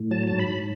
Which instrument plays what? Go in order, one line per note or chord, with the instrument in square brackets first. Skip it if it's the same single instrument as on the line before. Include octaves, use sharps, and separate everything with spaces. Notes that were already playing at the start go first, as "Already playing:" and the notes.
Already playing: [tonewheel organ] A2
F#3 A5
G#2 A5
B5
G#2